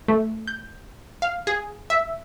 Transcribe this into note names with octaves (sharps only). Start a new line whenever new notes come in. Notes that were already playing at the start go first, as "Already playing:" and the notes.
A3
G6
F5
G#4
E5